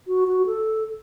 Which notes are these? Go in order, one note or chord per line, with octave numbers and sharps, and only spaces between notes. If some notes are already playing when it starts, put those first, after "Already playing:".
F#4
F#4
A4